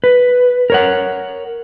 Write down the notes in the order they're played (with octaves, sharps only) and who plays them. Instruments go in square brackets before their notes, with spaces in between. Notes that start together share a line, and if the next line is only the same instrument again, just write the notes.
[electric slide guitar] B4
A#4 C#5 F#5